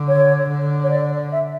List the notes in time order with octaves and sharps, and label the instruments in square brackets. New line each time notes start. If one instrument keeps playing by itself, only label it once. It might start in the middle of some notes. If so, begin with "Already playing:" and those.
Already playing: [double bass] D3
[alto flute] C#5
[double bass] D3
[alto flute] C#5
D5
E5